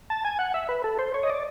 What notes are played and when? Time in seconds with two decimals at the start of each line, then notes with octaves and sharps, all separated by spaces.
0.10 A5
0.25 G#5
0.39 F#5
0.54 E5
0.69 B4
0.84 A4
0.99 C5
1.14 C#5
1.23 D#5
1.30 D5